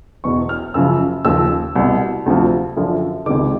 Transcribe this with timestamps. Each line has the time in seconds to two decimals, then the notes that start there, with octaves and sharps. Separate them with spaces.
0.24 E2 B2 C#6
0.49 F6
0.74 F#2 C#3 F3 E6
1.25 D#2 C#3 F3 E6
1.76 C2 B2
2.26 D2 C3 F3
2.77 F#2 D3 F3
3.26 C#2 C3 D#3 D6